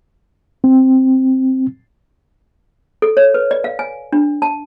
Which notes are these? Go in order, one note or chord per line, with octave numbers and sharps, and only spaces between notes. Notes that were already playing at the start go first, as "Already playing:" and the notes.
C4
A4
C#5
B4
D5
F5
G#5
D4
A5